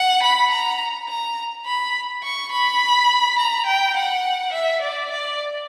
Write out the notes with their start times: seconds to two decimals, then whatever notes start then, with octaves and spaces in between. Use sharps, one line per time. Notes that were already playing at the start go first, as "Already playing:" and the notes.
Already playing: F#5
0.23 B5
0.50 A#5
1.08 A#5
1.65 B5
2.23 C#6
2.51 B5
3.39 A#5
3.66 G5
3.96 F#5
4.52 E5
4.82 D5
5.10 D5